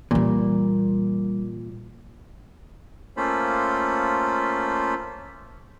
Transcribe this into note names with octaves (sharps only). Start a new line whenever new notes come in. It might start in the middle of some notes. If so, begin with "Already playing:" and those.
A#2 E3 G3
A3 A#3 C#4 F4 C5 B5